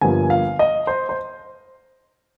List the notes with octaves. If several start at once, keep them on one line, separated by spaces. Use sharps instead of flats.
G1 G2 F3 A#3 G#5
F5
D#5
C5
C5